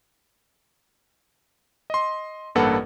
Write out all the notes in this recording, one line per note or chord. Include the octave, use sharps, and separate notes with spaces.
D#5 C6
A1 G2 A#3 A4 B4 F#5